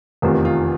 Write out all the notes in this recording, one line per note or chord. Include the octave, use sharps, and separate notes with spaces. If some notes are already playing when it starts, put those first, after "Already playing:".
F1 E2 C3 D#3 F4
F4